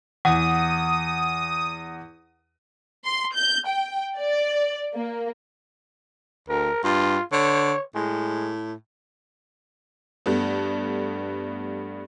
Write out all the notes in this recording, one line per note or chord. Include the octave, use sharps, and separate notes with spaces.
E2 F#5 D#6
C6
G6
G5
D5
A#3
D2 A#4
G2 F4
D3 C#5
A2 G#3
G2 A3 B3